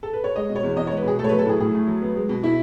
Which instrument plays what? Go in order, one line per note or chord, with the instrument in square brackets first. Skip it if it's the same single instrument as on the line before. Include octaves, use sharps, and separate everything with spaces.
[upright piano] A4
B4
C#5
G#3 D#5
B2
C#5
E2
E2 D#5
C#5
G#3
B4
B2 G#4
A3 A4
C#5
F#3 B4
A4
A2 G#4
A2 G#4
A3
F#3
B3
G#3
B2
B2 E4